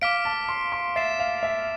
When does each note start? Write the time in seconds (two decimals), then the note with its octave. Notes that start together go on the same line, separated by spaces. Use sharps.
0.01 F5 D6 F6 B6 D7
0.25 A5
0.49 C6
0.72 C6
0.96 E5 A6 C7 E7
1.19 F5
1.43 E5